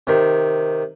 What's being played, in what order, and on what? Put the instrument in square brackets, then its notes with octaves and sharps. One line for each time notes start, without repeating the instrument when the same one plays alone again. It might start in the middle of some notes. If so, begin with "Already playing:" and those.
[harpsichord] C3 D#3